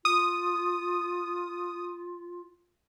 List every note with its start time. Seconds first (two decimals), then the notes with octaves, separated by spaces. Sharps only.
0.05 F4 D#6